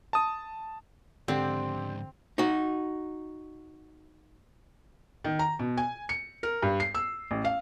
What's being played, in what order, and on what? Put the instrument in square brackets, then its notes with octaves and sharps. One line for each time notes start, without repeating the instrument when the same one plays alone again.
[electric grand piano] A5 D#6
[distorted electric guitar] G#2 F3 [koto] D3 [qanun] C4 [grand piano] D4 G4
[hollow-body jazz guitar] D#4 F#4
[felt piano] D#3
A#5
B2
G#5
C#7
A#4
G2
C7
E6
A1
F5